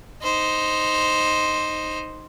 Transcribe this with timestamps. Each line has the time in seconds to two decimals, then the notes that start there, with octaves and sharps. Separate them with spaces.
0.23 D#4 C5